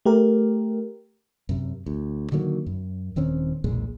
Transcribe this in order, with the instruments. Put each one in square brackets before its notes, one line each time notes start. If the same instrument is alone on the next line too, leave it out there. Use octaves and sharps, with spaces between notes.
[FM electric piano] A3 G4 A#4
[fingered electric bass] F#2 C3
D2
D3 D#3 F#3 A#3
F#2
D#1 D#3 C4 C#4
E1 B1 A#2 G#3